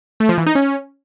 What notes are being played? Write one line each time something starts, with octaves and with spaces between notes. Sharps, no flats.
A3
F3
E3
D#4
C#4